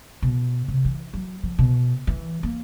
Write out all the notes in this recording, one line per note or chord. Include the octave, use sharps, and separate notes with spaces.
B2
C3
E3
F#3
F3
B2
E3
A#3